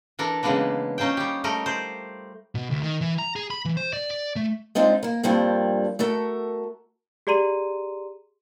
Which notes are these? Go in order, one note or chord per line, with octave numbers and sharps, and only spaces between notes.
E3 D4 A4 A#4
C#3 E3 G#3 A#3 B3 D4
C#4 D#4 F4 C5 G5
G3 G4
G3 A3 A#4 D#5
C5 D5
B2
D2
D#3
E3
A#5
G#4
B5
E3
C5
D5
D5
A3
G#3 C4 D4 D#4 F4
A#3 A#4
G2 F3 G3 A#3 C4 D4
A3 F#4 A4 A#4
G4 G#4 D5 A#5 C6 D#7